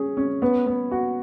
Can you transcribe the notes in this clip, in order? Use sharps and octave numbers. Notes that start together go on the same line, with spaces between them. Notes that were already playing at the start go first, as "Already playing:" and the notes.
Already playing: C#4 G#4
C#4
B3
B3
F#4